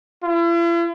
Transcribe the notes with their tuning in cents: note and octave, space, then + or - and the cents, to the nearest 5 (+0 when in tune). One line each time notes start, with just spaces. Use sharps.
E4 +45